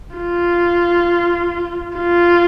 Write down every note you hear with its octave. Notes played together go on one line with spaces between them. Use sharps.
F4
F4